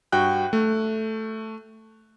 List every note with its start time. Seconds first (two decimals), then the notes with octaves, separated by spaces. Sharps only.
0.12 G2 F#4 G5 F#6
0.53 A3